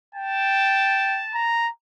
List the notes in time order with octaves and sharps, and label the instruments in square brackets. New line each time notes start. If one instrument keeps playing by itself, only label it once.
[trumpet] G5 [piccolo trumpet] A5
[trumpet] A#5